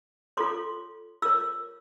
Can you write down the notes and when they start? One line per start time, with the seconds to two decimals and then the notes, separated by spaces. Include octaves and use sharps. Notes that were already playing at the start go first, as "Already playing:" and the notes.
0.37 F4 A4 C#5 C6 D6
1.22 F4 A#4 C#5 D6 E6